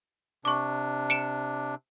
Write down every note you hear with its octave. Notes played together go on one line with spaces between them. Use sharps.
C3 D4 C#6 D6
C#7 D7 E7